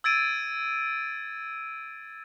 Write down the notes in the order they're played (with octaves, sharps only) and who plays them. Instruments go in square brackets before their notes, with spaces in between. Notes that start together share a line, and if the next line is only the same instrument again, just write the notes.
[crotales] E6 G#6 A6 D7 D#7